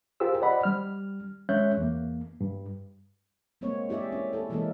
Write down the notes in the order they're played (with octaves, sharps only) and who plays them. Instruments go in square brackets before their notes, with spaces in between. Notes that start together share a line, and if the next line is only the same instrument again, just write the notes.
[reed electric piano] F4 G4 G#4 A#4 C5 E6
C5 D5 D#5 F#5 B5
G3 F6
G#3 C#4 C#5 E5 F#6 G6
E2 A#3
G2
[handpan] G3 G#3 A#3 C4 C#5
E4 G4 G#4 D5 E5
C#4
E4 A4
E3 G#3 A#3 E4 A4 A#4